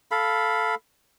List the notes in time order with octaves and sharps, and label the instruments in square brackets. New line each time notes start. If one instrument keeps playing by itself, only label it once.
[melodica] A4 F5 B5